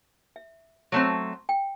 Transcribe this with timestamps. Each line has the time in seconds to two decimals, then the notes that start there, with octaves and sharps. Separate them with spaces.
0.36 E5
0.92 F#3 A3 C4
1.49 G5